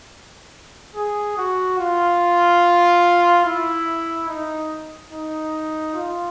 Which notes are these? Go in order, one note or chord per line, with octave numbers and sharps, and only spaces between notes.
G#4
F#4
F4
E4
D#4
D#4
F4